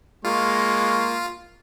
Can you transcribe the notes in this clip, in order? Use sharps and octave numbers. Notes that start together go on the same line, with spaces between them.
G#3 A#3 F4 C#6